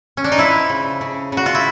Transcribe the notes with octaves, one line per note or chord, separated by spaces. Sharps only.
C#4
D4
D#4
F3 E4
C#3
C#3
C#3 F#4
F4
E4